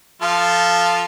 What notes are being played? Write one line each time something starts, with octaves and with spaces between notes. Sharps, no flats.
F3 F4 A4